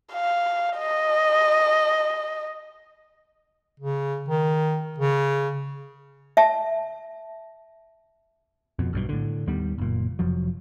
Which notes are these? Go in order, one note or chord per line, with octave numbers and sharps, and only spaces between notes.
F5
D#5
C#3
D#3
C#3
E5 A5
F2 B2
B1 G2 B2
A2 D3
D#2 D#3 G3 B3
F#1 A#2
F1 F2 F3 F#3